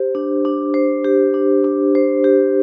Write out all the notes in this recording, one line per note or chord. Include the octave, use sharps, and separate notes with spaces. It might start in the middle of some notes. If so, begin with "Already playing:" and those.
Already playing: G4 C5
D4
D4
C5
G4
D4
D4
C5
G4